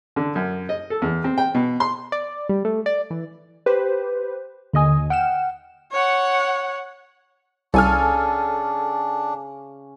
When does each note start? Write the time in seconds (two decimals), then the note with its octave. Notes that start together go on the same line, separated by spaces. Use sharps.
0.16 D3
0.35 F#2
0.69 D#5
0.90 A4
1.02 E2
1.24 C4
1.38 G5
1.55 B2
1.80 C6
2.12 D5
2.49 G3
2.65 A3
2.86 D5
3.10 E3
3.66 G4 B4 C5
4.74 D#2 D3 D#5 G#5 D#6
5.10 F#5 G5 F6 E7
5.92 C#5 F#5
7.74 C2 C#3 D4 A4 G#5 F6